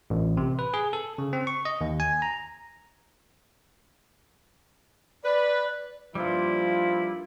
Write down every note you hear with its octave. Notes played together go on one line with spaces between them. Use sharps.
A1
C3
B4
G#4
A4
C#3
C4
C#6
D#5
D#2
G#5
A#5
B4 D5
G2 A#2 F3 G3 E4 F4 F5